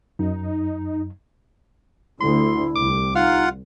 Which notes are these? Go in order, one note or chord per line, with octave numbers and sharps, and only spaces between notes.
F#2 D#4
D2 D3 E4 C6
C2 D6
D#4 F4 F5 F#5